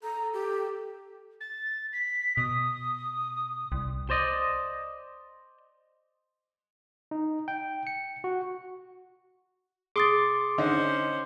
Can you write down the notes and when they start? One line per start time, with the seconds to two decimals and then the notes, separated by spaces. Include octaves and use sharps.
0.03 A4 A#5
0.34 G4
1.41 A6
1.93 B6
2.37 B2 D#6
3.72 C2
4.10 C5 D5 D#5
7.11 D#4
7.48 G5
7.87 C#7
8.24 F#4
9.96 G#4 C6 D6 D#6 A6
10.58 D3 C#4 D#4 C5